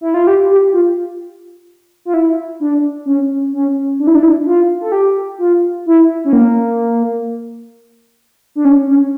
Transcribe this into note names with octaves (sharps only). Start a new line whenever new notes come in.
E4
F4
G4
G4
F4
F4
E4
D4
C#4
C#4
D4
E4
D4
E4
D4
F4
A4
G4
F4
E4
C#4
A#3
D4
C#4
C#4